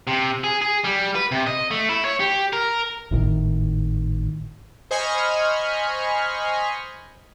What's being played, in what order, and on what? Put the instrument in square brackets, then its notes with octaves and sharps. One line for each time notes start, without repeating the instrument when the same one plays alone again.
[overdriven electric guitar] C3
G#4
G#4
G3
B4
C3
D#5
A3
E4
C#5
G4
A#4
[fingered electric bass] G#1 A2 D3 D#3
[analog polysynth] C5 D#5 G#5 B5 C#6 F6